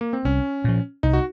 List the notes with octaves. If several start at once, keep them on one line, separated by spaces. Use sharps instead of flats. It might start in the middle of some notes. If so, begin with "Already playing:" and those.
A#3
C4
C2 C#4
A#2 F3
C2 D#4
F#4